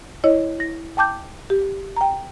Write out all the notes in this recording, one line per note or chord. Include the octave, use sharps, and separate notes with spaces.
E4 C#5 D#5
E4 A#6
G5 A5 D6 G6
G4
G5 A#5